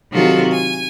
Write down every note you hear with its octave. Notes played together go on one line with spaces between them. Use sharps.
C3 D#3 F#3 F4 F#4 A4
G#5